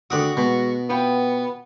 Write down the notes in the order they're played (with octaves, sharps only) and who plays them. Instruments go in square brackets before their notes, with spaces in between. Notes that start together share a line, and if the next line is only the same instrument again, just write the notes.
[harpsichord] D2 F#5 D#6 [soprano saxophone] F#4 [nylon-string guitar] G4 D5
[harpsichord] B2 [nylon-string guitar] G#3
[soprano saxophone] B3 [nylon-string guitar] F4 B4 G5